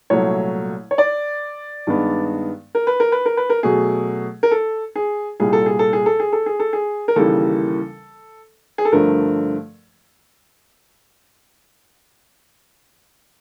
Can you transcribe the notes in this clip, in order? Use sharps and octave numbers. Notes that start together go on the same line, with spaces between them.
C2 A#2 F#3 A3 C#5
C#5
D5
G2 D#3 G#3 B3
A#4
B4
A#4
B4
A#4
B4
A#4
B2 F#3 A3 G#4
A#4
A4
G#4
C2 A#2 G3 G#4
A4
G#4
A4
G#4
A4
G#4
A4
G#4
A4
G#4
A#4
D#2 C#3 E3 G3 A#3 A4
G#4
A4
G2 D3 F3 A3 A#4